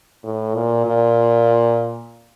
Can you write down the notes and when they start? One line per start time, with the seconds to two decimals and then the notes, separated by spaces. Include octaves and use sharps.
0.23 A2
0.54 A#2
0.85 A#2